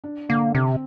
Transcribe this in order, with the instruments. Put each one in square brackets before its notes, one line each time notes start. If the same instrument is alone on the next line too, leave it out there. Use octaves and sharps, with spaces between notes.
[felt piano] D4
[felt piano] D3 [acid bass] A#3
[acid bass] C3 [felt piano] C4